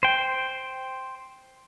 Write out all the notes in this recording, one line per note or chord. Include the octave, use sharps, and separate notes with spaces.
C5 G5